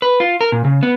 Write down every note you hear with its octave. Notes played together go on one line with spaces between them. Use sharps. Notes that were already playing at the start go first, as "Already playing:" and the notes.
B4
F4
A#4
A#2
C#3
B3